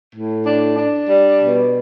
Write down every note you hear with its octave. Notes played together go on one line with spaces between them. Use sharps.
A2
D4
D4
G3
B2